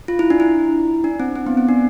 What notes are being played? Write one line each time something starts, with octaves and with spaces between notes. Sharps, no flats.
F4
E4
D4
E4
D4
C4
C4
B3
C4
D4